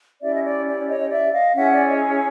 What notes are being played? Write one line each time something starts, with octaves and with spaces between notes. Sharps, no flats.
C#4 E4 G4 D5 E5
D#5
D5
D5
C#5 D#5
D#5
D5 E5
D#5 F5
C#4 E4 G#4 E5 F#5
D5
C#5 D#5
C#5